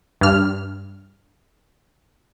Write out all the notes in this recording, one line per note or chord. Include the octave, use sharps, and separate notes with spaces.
G2 F6